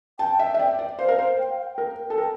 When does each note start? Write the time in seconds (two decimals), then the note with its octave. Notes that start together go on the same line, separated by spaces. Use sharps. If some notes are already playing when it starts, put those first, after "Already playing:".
0.19 G5 A5
0.39 E5
0.54 E5
0.59 D5
0.79 D5
0.99 C5 F5
1.09 A#4
1.18 C5
1.38 G5
1.50 F5
1.62 G5
1.78 A#4 G5
2.10 A4
2.18 A#4